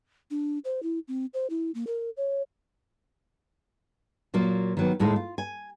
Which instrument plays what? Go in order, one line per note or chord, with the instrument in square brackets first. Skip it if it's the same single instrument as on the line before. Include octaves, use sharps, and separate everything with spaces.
[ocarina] D4
C5
E4
C4
C5
E4
A#3
A#4
C#5
[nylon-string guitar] A#2 F#3 A#3 F4
D#3 F#3 B3
D#2 A2 G#3 D#4
F4
G#5